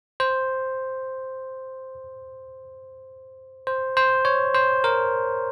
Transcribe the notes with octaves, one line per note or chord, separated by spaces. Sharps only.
C5
C5
C5
C#5
C5
A#4